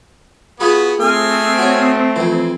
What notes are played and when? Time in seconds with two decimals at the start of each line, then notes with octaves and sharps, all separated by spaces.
0.60 B3 F4 F#4 G#4 B5
1.00 A3 C4 G#5 D#6 F6
1.59 F#4 C#5
2.16 F2 E3